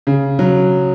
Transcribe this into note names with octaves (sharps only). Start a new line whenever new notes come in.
C#3
F#3